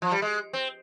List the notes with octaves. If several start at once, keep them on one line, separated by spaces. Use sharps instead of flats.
F3
G3
G#3
C4